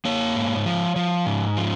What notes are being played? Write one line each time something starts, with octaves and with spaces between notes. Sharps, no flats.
A#3 C#5
G#2
F3
F3
G#2
F3